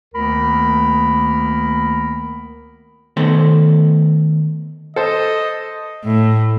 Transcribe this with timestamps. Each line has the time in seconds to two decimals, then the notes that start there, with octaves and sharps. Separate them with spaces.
0.15 D2 D#3 A#3 B3 A#4 B5
3.17 D#3 A3 B3 A4 C5
4.96 A4 C5 D#5
6.04 A2